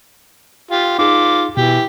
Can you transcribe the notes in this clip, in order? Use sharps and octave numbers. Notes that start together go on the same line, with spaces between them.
F4 G4
D#4 F4 G#4 D6
B2 E3 G4